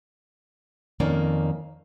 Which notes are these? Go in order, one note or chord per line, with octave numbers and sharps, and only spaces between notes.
F2 D#3 A#3 C#4 D5